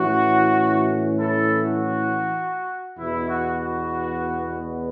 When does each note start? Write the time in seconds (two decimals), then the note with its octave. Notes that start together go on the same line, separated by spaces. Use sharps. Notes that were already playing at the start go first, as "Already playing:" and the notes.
Already playing: A2 E3 C#4 E4 F#4
1.18 E4 A4
1.64 F#4
2.98 E2 B2 B3 E4
3.29 F#4
3.58 F#4